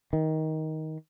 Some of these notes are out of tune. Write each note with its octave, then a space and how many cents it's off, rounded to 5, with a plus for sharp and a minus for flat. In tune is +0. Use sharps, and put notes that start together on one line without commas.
D#3 +15